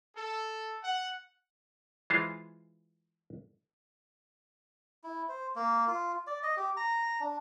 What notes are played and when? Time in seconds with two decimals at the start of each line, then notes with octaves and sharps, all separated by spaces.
0.16 A4
0.83 F#5
2.10 E3 G#3 F4 C5 F5
5.04 E4
5.29 C5
5.56 A#3
5.88 F4
6.27 D5
6.43 D#5
6.57 G4
6.77 A#5
7.20 D4